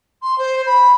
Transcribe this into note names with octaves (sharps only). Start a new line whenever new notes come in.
C6
C5
B5